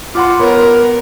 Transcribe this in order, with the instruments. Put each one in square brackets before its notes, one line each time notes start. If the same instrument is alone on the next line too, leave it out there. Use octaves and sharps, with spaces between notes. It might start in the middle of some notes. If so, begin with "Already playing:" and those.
[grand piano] F4 F#5 C6 [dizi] D6
[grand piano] B3 C#5 [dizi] A#4